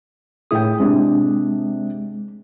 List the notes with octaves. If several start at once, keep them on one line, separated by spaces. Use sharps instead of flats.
A2 E4 G#4 G5 D#6
C3 G#3 D4